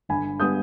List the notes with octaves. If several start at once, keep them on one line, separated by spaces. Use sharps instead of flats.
G1 G#5 B5
G3 B3 D#6 G6